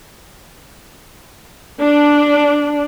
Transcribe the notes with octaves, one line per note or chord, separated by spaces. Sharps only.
D4